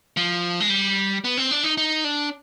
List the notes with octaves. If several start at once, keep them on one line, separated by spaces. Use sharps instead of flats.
F3
G#3
G3
B3
C4
D4
D#4
D#4
D4